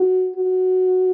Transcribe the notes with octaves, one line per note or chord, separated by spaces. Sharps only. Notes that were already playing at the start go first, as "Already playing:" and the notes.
Already playing: F#4
F#4